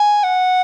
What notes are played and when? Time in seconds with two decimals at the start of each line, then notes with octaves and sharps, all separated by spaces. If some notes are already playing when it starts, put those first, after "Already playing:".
Already playing: G#5
0.24 F#5